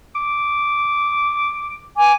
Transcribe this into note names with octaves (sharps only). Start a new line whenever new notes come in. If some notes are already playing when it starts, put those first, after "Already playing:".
D6
G#5 D6